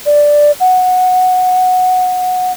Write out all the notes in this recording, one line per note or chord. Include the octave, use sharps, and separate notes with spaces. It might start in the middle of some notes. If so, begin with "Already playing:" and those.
D5
F#5